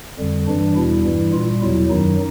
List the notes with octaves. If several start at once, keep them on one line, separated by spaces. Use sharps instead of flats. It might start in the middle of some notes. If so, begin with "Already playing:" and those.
F2 D3 G3
G2 E3 G3 D4
E2 B2 G3 E4
G2 E3 G3
A#2 G3 F4
E2 B2 F#3 E4
F#2 D#3 F#3 D#4